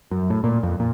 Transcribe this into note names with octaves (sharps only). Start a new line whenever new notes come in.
F#2
A2
A#2
F2
A#2